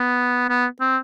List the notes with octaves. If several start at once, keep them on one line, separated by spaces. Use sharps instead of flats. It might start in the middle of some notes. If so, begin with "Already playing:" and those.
Already playing: B3
B3
C4